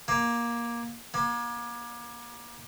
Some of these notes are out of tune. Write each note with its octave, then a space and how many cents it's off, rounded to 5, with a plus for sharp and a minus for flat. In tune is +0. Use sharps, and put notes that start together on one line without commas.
A#3 +15
A#3 +35